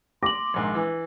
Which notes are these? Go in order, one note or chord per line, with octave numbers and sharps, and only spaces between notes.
C6 D6 A#6 F#7
A#1 G#2 D#3
E3